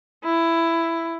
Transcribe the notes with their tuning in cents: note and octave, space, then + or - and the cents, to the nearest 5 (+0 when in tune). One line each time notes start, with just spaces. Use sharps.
E4 +10